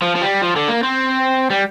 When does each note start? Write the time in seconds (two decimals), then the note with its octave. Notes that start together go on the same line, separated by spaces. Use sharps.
0.02 F3
0.16 F3
0.21 G3
0.42 F3
0.56 D3
0.68 A#3
0.83 C4
1.50 G3